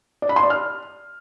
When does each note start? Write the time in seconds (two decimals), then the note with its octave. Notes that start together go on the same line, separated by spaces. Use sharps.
0.22 D5
0.29 B5
0.36 C6
0.43 D5
0.50 F6